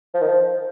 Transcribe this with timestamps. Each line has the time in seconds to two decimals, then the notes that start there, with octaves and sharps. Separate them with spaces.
0.14 F3
0.21 D#3
0.28 F3